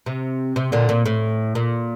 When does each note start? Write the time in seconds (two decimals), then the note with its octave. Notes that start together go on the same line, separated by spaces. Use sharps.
0.06 C3
0.56 C3
0.72 A#2 D3
0.89 A#2
1.06 A2
1.55 A#2